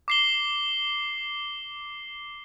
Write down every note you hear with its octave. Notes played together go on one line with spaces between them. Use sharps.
D6 C7 G7